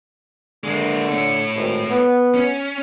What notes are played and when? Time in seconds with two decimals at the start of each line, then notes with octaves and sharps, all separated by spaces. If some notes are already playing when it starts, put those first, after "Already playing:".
0.64 D3 G#3 A#3
1.09 A3 C#5
1.55 G#1
1.89 B3
2.35 C#4